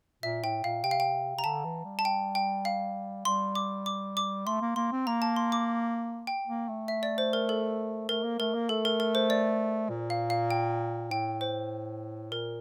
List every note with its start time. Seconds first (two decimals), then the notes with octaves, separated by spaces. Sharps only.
0.23 A#2 E5
0.44 A2 G5
0.64 A#2 F5
0.84 C3 G5
0.91 F5
1.00 G5
1.36 C3 A#5
1.44 D3 A5
1.65 E3
1.85 G3
1.99 A5
2.05 G5
2.35 G5
2.65 F5
3.25 G3 C6
3.55 D6
3.86 D6
4.17 D6
4.46 A3 C6
4.61 A#3
4.76 A#3 C6
4.92 C4
5.07 A#3 A#5
5.22 A5
5.36 C6
5.52 D6
6.27 G5
6.47 A#3
6.69 A3
6.88 E5
7.03 D5
7.18 C5
7.33 A#4
7.49 A4
8.09 A3 A#4
8.23 A#3
8.39 A3 A#4
8.54 A#3
8.69 A3 A4
8.85 A#4
9.00 A#4
9.15 C5
9.30 D5
9.90 A#2
10.10 F5
10.30 F5
10.51 G5
11.11 A2 G5
11.41 C5
12.32 A#2 A#4